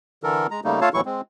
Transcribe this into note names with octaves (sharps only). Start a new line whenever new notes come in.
D3 E3 A4 A#4
G#3 A#5
C#3 G3 A3 A#3 D#4
A3 F4 A4 C#5 F5 A5
D#2 A2 E3 F#3 E4 C#6
G#3 C4